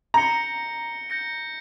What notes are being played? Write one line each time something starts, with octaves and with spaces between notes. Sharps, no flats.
A#5 G6 A#6 C#7 G7
G6 A#6 C#7